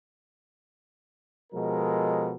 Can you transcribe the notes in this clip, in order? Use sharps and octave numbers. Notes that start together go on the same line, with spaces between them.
B2 F3 G#3 A4 A#4